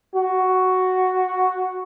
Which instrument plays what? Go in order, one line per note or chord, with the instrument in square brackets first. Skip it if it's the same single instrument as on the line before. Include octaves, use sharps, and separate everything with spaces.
[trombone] F#4